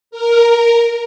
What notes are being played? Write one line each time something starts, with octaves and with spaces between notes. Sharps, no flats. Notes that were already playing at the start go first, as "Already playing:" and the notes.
A#4